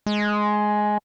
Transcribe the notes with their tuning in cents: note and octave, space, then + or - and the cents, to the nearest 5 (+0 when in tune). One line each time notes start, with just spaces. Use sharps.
G#3 +10